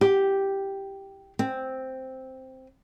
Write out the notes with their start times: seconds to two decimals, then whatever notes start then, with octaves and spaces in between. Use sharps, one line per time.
0.01 G4
1.39 C4